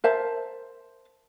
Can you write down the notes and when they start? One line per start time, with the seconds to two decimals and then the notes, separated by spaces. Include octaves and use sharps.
0.04 A#4 C5 E5 A5